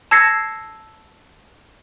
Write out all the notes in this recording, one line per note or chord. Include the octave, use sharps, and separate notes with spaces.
A5 E6 G#6 A#6 C7 C#7